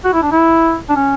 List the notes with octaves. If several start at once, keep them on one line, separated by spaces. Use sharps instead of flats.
F#4
E4
D4
E4
D4
C#4